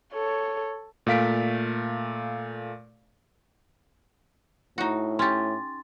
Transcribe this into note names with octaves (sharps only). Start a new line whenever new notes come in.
A4 C#5
A#2 A3 F5 B6 D7
A2 D#4 F#4
C#4 G4 C6 A6